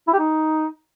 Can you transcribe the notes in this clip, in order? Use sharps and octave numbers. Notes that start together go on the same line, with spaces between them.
E4
G4
D#4